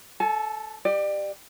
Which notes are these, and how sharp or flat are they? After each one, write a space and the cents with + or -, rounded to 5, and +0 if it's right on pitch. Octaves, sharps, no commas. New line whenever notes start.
A4 +0 G#5 +40
G4 +0 D5 +30